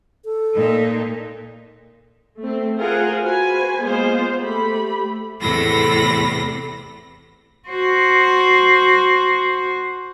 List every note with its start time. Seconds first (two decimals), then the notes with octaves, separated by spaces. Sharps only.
0.25 A4
0.55 A#2 D#4
2.39 A3 C4
2.79 F4 G#4 A#4 C5 F#5 G#5
3.24 F#4 B4 C5 G#5
3.82 G#3 A#3 B3 F4 G#4 C5
4.42 A3 G4 B5
5.40 E2 A2 C3 A4 B5 A#6
7.68 F#4 C5